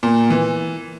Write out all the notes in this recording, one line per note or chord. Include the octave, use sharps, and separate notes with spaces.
A#2
E3